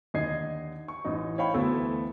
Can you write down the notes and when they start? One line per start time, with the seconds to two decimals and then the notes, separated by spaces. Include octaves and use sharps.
0.14 D#2 D3 D#5 G#6 C7
0.88 C#6
1.04 A1 E3 D#4
1.38 C#5 E5 F5 G5 B5 C#6
1.54 D2 E3 A3 B3 E4 E6